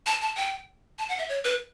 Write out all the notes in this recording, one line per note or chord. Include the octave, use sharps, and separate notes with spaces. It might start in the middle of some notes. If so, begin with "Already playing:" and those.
A5
A5
G5
A5
F#5
E5
C#5
B4